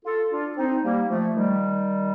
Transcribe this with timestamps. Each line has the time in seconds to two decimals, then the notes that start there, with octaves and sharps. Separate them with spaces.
0.05 F4 A4
0.31 D4 F4
0.57 C4 D#4
0.83 G3 A#3
1.09 F3 A3
1.36 D#3 G3